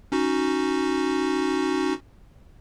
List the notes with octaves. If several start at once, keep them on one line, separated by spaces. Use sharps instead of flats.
C#4 D#4 F#4